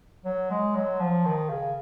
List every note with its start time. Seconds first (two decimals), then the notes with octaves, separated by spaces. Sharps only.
0.25 F#3
0.50 G#3
0.75 F#3
1.00 F3
1.26 D#3
1.50 C#3